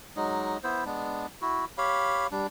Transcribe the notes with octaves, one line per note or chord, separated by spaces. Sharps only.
F#3 G#3 D#4
B3 E4 C5
G#3 B3 D4
E4 F#4
G4 C#5 F5 B5
G3 D4